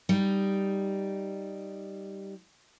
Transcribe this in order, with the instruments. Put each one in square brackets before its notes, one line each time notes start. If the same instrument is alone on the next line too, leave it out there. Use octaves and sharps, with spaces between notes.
[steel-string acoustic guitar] G3 D#4